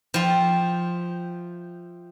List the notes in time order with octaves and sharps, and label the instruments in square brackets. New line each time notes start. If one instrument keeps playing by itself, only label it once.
[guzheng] F3 F4 [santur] E5 G5